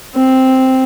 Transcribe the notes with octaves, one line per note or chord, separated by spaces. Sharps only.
C4